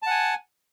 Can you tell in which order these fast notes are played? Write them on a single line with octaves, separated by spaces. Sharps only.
A5 F#5 G#5